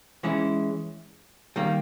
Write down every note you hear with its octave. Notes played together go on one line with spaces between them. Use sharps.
E3 G#3 C#4 E4
D#3 G3 A#3